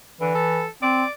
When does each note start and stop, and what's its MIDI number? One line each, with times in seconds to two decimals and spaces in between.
0.21 0.31 50
0.21 0.64 52
0.35 0.67 69
0.82 1.04 60
0.82 1.11 74